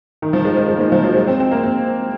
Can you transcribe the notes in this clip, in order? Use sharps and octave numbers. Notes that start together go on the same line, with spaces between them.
D#3
F3
G#3
G#3
G#3
A#3
G#3
F3
F#3
G#3
C4
C4
A#3
C4